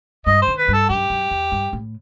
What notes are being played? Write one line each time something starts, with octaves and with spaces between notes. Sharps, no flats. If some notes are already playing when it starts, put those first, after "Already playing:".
G2 D#5
C5
D#3
B4
G2
A4
F#2 G4
F#2
E2
G2
A2